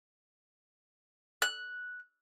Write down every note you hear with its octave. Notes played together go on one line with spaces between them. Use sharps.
F#6